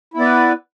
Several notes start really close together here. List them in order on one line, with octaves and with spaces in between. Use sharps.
E4 B3 D5 B4